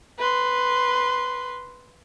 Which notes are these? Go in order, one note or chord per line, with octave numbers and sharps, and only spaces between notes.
B4 C6